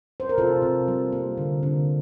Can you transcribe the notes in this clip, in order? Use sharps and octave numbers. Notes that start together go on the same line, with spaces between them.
C5
A#4
C3 F4 A4
C3
G3
A#3
D3
D3